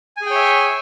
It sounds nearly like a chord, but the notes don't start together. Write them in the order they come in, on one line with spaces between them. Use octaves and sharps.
G#5 G#4 G5 C#5 E5